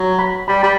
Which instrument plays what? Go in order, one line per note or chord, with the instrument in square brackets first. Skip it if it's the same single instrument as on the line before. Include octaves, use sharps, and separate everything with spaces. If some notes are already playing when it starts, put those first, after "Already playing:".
Already playing: [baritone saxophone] F#3
[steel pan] B5
[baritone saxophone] G3 [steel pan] B5
[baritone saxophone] G3 [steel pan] B5